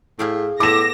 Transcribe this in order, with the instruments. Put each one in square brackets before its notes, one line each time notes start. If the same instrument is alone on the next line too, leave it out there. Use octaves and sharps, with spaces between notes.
[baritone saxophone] A2 [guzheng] G#4 F5 G5
[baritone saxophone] A2 [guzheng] B3 A4 [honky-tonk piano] D6 E7 [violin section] A#6